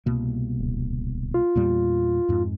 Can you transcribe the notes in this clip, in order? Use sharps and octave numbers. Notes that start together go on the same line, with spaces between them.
C2 B2 A#3
D1
F4
E2 A#2 G3
F2 G#2